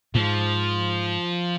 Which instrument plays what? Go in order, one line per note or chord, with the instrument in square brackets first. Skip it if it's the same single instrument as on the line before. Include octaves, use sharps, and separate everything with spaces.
[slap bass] G#2 [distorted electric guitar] F3